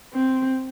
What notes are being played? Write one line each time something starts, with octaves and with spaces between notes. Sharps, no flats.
C4